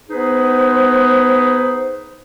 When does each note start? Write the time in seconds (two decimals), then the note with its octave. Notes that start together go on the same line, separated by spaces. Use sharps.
0.09 B3 D#4 G#4 B4 C5